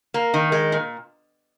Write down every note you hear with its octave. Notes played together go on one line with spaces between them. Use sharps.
A#3
D#3
G#3
A#2